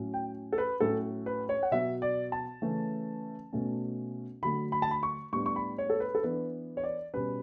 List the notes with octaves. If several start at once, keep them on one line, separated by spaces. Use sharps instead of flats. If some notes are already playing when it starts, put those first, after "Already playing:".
Already playing: A2 F#3 C#4
G5
A4
B4
A2 F#3 C#4 A4
B4
C#5
F#5
B2 F#3 B3 E5
D5
A5
C#3 E3 A3 C#4
B2 A3 C#4
D3 F#3 A3 B5
B5
A5
B5
C#6
A2 G3 B3 D4 C#6
C#6
B5
C#5
A4
B4
A4
E3 B3 D4 B4
C#5
D5
B2 G3 C#4 B4